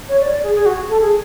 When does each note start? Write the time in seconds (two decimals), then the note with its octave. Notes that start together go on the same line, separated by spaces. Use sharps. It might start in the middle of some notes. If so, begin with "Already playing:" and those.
0.09 C#5
0.20 D5
0.32 D5
0.43 G#4
0.55 G#4
0.66 F#4
0.89 A4
1.01 G#4